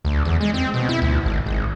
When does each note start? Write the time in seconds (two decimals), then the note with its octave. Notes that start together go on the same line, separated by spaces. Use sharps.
0.05 D2
0.25 E2
0.41 G#3
0.54 C4
0.74 B2
0.89 E4
1.02 D2
1.25 G#1
1.46 G#1